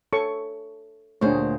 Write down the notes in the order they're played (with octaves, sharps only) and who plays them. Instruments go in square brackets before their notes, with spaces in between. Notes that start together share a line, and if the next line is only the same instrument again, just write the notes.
[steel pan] A4 C#5 C#6
[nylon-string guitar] D2 A#2 C5 [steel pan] D4 G#4 C#5